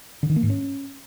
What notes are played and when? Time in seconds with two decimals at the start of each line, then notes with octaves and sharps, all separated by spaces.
0.23 D3
0.30 D#3
0.36 A#3
0.43 G#2
0.50 C#4